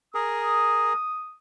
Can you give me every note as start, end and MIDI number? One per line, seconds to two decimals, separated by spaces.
0.14 0.93 68
0.14 0.93 70
0.14 1.38 87